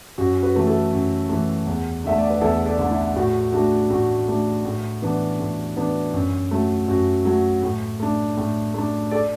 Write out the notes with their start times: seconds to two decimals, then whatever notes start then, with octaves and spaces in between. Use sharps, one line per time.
0.18 F#2 F#4
0.43 F#4 B4
0.55 E3 A3
0.67 E4 A4
0.93 F#2
1.29 E3 A3
1.67 E2
2.04 D3 A3 E5
2.18 D5
2.30 B4
2.41 E2 E4 A4
2.66 A4 D5
2.79 D3 A3
2.91 E4
3.16 A2 F#4
3.53 A3 D4 F#4
3.90 A2 F#4
4.28 A3 D4
4.65 A2
5.02 E3 B3 D4
5.39 A2
5.76 E3 B3 D4
6.14 F#2
6.51 F#3 A3
6.88 F#2 F#4
7.25 F#3 A3
7.63 A2
8.00 A3 D4
8.37 A2
8.74 A3 D4
9.11 A4 D5